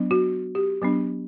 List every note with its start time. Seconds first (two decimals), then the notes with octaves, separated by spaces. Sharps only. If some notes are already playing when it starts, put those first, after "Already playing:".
Already playing: F#3 B3 D4
0.11 F#4
0.55 G4
0.82 F#3 B3 D4